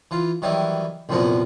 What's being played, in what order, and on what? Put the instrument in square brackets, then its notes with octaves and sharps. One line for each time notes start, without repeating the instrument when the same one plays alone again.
[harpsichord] E3 F4
D#3 E3 F#3 G3 E4
C2 F#2 A#2 F3 F#3 B3